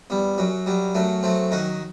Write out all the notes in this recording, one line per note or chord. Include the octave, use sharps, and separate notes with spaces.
E2 G3
F#2 F#3
F#3 G3
F#2 F#3 A3
F#3 A3 C4
D#3 D#4 F#4